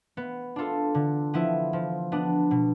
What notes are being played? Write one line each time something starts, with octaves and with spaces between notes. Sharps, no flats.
B3
D4 F4 A4
D3
F3 B3 E4
F3
B3 D4
B2